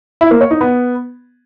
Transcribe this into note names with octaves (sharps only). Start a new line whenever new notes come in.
E4
A#3
C#5
D#4
B3